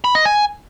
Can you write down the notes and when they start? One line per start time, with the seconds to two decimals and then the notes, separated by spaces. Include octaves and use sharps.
0.04 B5
0.15 D#5
0.25 G#5